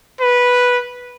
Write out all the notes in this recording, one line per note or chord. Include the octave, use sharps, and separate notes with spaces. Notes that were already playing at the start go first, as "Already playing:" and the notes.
B4